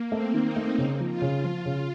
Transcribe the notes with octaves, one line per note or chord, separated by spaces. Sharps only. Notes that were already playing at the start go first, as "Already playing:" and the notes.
Already playing: A#3
A3 C4
D#3
D#4
A3
C#3
F3
F4
C#3
F3
C#3